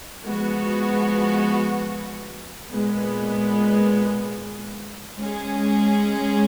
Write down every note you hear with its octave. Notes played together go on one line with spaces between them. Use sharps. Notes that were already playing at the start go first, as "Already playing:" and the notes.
F3 G#3 B3 F#4
A#2 G#3 B3
G#3 C#4 G#4